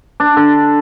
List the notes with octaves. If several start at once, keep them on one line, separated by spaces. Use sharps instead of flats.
D4
D3